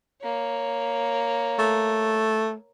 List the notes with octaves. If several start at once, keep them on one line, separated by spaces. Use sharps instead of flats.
A#3 C#5
A3